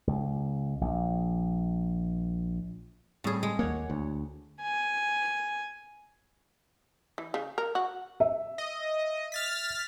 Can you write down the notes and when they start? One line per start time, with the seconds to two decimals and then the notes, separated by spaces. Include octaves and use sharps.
0.07 C#2
0.81 A#1
3.24 A2 G3 C4 G#4
3.43 G#3
3.59 D#2 A#3 C#5 F#5
3.90 D2
4.62 G#5
7.18 E3
7.34 C#3
7.58 A#4
7.75 F#4
8.20 E5
8.58 D#5
9.32 F6 A6 B6